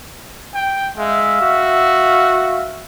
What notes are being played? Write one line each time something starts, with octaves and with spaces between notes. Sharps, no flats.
G5
G#3 E5 F5
F#4